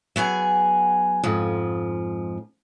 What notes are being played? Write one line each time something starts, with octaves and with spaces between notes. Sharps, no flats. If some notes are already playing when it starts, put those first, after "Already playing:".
F#3 B3 G#4 G#5
F2 G#2 F3